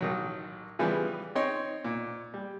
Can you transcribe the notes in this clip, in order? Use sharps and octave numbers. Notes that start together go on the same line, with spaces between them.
A1 D#3 F#3
C#3 E3 F3 G3 B3
C4 D#4 C#5 C6
A#2
G3